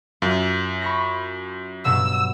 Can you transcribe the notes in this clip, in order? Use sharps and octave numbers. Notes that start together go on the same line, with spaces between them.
F#2 F4
B5 C#6 A#6
G2 B2 F#3 E6